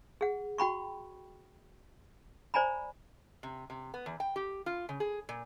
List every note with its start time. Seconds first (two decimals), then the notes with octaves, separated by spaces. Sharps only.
0.21 G#4 F#5
0.58 F#4 G5 B5 C#6
2.54 C5 D5 G#5 A#5 B5
3.43 C3
3.70 C3
3.94 B3
4.06 E2
4.20 G5
4.36 G4
4.66 F4
4.89 C#3
5.00 G#4
5.29 A#2